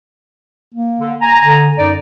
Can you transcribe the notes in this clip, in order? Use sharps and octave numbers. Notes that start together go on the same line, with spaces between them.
A#3
D3
G#5 A#5
D3
F#2 D#4 D5